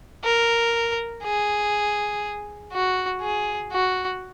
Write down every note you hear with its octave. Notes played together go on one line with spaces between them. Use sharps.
A#4
G#4
F#4
G#4
F#4